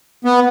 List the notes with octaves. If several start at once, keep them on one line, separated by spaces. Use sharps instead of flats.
B3